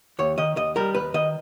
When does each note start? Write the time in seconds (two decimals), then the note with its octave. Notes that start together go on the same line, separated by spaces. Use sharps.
0.19 D#2 C#5
0.38 D#3 D#5
0.57 D#2 D#5
0.76 G3 A#4
0.95 D#2 B4
1.14 D#3 D#5